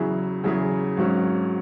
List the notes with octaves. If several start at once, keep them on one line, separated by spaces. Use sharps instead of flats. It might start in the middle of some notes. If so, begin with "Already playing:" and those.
Already playing: E2 C#3 F#3 E4 G#4
E2 C#3 F#3 E4 G#4
G#1 G#2 F#3 C#4